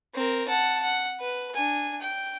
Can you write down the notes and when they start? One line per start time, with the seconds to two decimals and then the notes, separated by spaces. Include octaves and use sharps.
0.15 C4 A#4
0.48 F#5 A5
0.83 F#5
1.20 B4
1.54 D4 G#5
2.02 G5